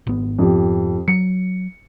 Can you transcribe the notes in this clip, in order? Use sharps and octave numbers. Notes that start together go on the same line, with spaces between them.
G#1 B3
F2 G4
F#3 C#7